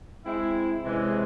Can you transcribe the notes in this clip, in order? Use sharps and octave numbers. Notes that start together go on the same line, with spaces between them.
G#3 C4 E4
C3 E3 G#3 C#4